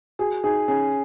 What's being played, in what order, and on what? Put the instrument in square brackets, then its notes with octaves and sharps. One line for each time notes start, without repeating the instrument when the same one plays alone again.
[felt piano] F#4 [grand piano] G#4
[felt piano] D#4 [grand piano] G#4
[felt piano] C#4 [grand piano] G#4